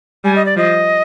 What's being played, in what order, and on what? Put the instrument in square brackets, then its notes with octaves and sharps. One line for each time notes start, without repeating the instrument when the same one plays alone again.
[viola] G3 [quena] G#5
[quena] D#5
D5
[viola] F3 [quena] D#5